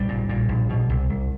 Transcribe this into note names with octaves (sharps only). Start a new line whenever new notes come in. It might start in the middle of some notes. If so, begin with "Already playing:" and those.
Already playing: A#1 G3
A#2
A#2
A#1
B2
C2
C2